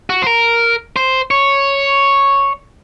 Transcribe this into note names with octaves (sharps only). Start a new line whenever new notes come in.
F#4
C5
A#4
C5
C#5